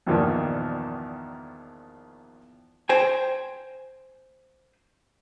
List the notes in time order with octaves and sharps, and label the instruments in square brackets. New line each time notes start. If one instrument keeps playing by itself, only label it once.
[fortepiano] E2 G2 A#2 D#3 F3
[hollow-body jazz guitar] C5 G5 G#5